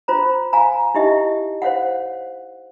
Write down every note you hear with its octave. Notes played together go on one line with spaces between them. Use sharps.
F4 C5 A#5
F5 G#5 A#5
D#4 E4 G4 D#5 E5
C5 C#5 F5 F#5